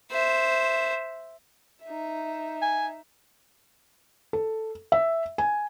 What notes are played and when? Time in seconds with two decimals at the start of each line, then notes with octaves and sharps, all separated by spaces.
0.11 C5 E5
1.84 D#4 E5
2.62 G#5
4.33 A4
4.92 E5
5.38 G#5